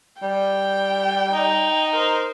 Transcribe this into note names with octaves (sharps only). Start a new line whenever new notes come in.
G3 G5
D#4
A#4 C5